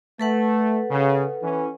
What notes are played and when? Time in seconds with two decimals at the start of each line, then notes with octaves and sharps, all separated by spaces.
0.20 A3 A4 B4 F#5
0.90 C#3
1.42 E3 C#4